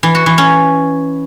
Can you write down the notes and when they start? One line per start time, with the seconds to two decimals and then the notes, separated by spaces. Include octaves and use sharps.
0.03 E3
0.15 F#4
0.26 E3
0.38 C#4